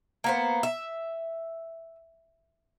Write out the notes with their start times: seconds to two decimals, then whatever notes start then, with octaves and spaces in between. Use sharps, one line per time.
0.24 A#3 B3 C5
0.63 E5